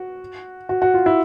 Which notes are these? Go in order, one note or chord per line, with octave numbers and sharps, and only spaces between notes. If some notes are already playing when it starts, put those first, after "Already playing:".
Already playing: F#4
F#4
F#4
F4
E4